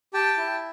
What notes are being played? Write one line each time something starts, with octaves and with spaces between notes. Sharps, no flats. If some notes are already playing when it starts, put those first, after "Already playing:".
G4 G5 A5
E4